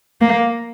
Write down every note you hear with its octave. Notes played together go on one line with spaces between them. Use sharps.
A#3